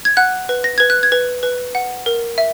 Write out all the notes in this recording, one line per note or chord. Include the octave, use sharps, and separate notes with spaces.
G#6
F#5 F#6
B4
A#6
B4 G#6
F#6
G#6
B4
B4
F#5
A#4
E5